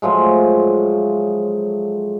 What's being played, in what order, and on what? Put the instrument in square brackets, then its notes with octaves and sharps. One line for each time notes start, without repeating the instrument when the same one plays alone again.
[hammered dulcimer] A2 F3 F#3 G#3